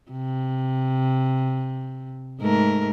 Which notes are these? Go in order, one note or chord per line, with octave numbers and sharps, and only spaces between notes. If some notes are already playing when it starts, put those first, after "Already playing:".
C3
G#2 A3 A#4